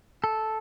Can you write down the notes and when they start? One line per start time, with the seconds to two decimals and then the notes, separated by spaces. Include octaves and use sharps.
0.24 A4